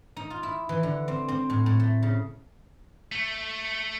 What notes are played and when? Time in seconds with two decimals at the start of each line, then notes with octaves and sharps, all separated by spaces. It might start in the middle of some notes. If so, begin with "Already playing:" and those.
0.16 D#4
0.30 F4
0.43 E4
0.69 E3
0.83 D3
1.08 C4
1.28 C4
1.50 A2
1.66 A2
1.80 A3
2.03 C#3
3.12 A3